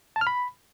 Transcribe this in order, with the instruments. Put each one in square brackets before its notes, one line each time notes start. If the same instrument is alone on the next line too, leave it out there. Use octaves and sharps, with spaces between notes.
[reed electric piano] A5
F6
B5